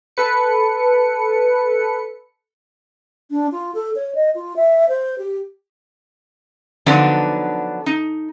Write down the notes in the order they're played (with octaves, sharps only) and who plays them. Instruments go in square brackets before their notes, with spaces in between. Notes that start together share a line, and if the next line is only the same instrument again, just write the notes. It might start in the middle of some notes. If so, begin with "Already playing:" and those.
[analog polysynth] A4 B4 C#7
[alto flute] D4
F4
A4
C#5
D#5
F4
E5
C5
G4
[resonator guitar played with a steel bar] D3 F3 F#3 B3 D4 D#4
D#4